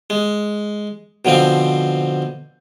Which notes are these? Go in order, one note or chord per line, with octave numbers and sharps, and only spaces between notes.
G#3
B2 D3 F3 C4